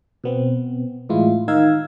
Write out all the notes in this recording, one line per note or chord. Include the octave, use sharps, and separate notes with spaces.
B2 B3 C4
A2 E3 G#3 E4 F4
D#3 D#4 F5 E6 G#6